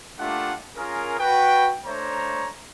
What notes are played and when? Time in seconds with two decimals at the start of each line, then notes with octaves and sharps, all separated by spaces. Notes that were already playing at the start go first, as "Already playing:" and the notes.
0.19 A3 A#3 D4 F4 G4 F#5
0.77 C#4 F4 G#4 A#4
1.19 F#4 B4 G5
1.86 A3 D4 C5 C#5 A#5